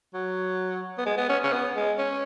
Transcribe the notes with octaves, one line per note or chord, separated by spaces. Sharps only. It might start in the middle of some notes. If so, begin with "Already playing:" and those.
F#3
B3
G#3
B3
C#4
C#4
B3
G#3
C#4